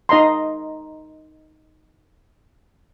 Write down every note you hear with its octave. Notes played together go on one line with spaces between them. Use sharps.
D#4 D#5 A#5 C6